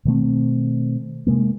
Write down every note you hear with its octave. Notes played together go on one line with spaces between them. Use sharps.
B2 D#3 A3 C4
C3 G#3 A#3